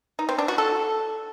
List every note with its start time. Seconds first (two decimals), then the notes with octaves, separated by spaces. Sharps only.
0.19 D#4
0.29 C4
0.38 D4
0.48 F#4
0.58 A4